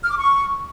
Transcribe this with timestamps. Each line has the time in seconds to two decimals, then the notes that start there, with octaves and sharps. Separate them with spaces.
0.04 F6
0.10 D6
0.17 C#6